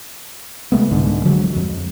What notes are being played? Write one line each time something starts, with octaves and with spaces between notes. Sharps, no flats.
C3 G#3 A3 B3
C2 G#2 D3
D3 F3 F#3 G#3
F2